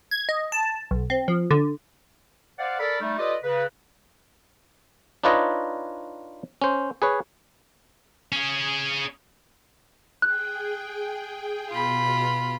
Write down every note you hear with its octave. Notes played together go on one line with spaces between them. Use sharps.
G#6
D#5
A5
B1
C4
F3
D3
C5 D5 F5 F#5
A4 A#4 D5 B5
G3 A3 D#4
F4 G4 A4 B4 D5 D#5
C#3 B4
D4 D#4 F4 B4 C#5 D#5
C#4 C5
G#4 B4 C#5
C#4 G#4
G#4 G5 F#6
B2 F4 B5